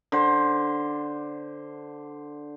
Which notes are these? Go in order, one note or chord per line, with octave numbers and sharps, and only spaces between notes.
D3 C5